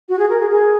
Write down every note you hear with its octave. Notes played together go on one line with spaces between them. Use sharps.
F#4
G#4
A#4
G#4
G#4